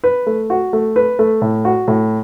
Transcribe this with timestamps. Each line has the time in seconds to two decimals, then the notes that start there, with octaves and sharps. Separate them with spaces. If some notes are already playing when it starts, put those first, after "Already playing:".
0.04 B4
0.27 A3
0.50 F#4
0.73 A3
0.96 B4
1.19 A3
1.42 A2
1.65 F#4
1.88 A2